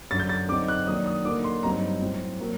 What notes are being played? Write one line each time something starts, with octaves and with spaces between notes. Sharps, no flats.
F#2 D3 F#3 A6
G6
A6
D3 F#3 C4 D#4 D6
F#6
D#3 F#3 A#3 D4 D#6
D#6
D3 F#3 A#3 D#4 D6
C6
G2 F#3 C4 D#4 A#5
A2 F#3 C4
F#3 A#3